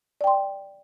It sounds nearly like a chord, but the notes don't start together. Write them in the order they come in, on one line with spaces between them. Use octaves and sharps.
D5 G5 C6